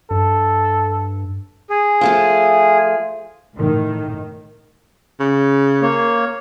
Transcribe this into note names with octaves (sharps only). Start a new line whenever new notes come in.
G2 A4
G#4
F3 A3 F4
A2 D#3
C#3
A#3 C#5